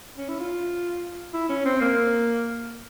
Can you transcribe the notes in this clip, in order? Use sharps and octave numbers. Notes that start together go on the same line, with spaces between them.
C#4
E4
F4
E4
C#4
C4
A#3